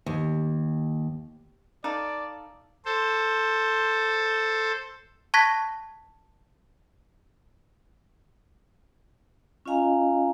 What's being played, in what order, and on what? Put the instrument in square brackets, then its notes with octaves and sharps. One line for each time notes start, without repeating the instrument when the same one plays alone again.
[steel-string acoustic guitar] D#2
[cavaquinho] D#4 A4 F5 [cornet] D5
[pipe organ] A4 C5
[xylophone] A5 C#6 F#6 G#6 A#6 B6
[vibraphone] C#4 F4 D#5 F5 G#5 A#5